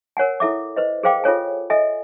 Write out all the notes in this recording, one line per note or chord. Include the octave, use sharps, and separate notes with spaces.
A#4 C#5 F#5 G#5
E4 A4 E5 D6
B4 C5 D#5
G#4 A#4 C5 F5 G5 D6
F4 A4 C#5 G#5
A4 D#5 E5 G#5